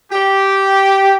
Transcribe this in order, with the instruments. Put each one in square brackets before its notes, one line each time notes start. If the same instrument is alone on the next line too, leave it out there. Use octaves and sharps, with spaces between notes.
[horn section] G4